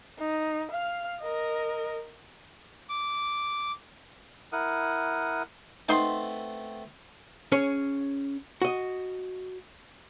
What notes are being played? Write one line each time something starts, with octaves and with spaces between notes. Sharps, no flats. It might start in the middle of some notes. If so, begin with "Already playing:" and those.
D#4
F5 F6
A#4 D#5
D6
E4 A#4 F#5 D#6
A3 B3 C4 D#4 C6
C#4 G#4 C#5
F#4 D#5